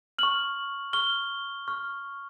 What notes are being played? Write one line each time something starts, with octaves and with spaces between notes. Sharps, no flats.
C#6 F6 F#7
C#6 F6 G7
C#6 F6